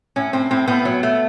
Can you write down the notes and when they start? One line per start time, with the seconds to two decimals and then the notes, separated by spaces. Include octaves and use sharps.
0.16 A2 C#4
0.33 A2 C4
0.51 A2 C4
0.68 A2 B3
0.85 F#3
1.03 A3